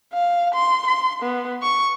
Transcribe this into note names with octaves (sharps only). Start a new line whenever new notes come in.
F5
C6
C6
B3
C#6